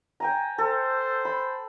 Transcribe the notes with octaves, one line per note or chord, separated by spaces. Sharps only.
G5 G#5 A#5
A4 C5
B5